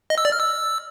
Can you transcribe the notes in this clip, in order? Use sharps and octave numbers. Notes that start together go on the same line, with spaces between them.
D#5
E6
D5
F6
E6